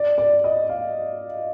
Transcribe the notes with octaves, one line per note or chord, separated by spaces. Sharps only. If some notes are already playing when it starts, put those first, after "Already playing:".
Already playing: D5
D5
D#5
F5